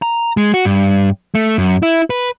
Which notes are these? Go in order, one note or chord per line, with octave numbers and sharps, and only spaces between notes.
A#5
G#3
F#4
G2
A3
F#2
E4
B4